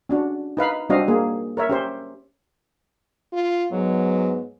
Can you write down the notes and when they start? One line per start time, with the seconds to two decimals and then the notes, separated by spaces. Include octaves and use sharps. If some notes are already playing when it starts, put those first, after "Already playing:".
0.09 C#4 D4 F#4
0.57 D#4 B4 F5 B5
0.89 G3 C4 D4 F#4 D#5 F5
1.08 A#3 G#4
1.57 A#4 C#5 E5
1.69 C#4 G4 C5
3.33 F4
3.72 G#2 F#3 B3